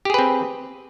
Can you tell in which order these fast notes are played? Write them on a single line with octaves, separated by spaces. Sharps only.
G4 G#4 B4 C4